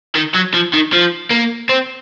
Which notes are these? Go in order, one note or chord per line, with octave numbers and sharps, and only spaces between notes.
D#3
F#3
F3
D#3
F3
A#3
C4